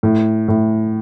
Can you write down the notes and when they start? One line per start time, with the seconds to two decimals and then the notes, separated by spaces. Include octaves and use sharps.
0.03 A2
0.48 A2